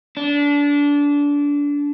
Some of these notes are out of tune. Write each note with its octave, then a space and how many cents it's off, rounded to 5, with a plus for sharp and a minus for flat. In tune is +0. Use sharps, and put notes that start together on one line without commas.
D4 -25